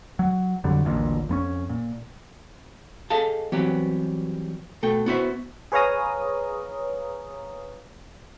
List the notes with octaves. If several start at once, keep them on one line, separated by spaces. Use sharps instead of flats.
F#3
F2 D3 F#3 G3
D#1 A1 D2 A#2
F2 B3 C#4
A#2
G#4 A4 D#5 F5 A5
E3 F#3 G3 B3 C4 G4
B2 A3 A4 G5
B3 E4 F#4 C5 C#5 E5
G#4 B4 C#5 F5 A#5 D#6